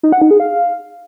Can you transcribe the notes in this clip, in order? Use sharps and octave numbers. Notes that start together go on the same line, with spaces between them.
D#4
F#5
D#4
G#4
F5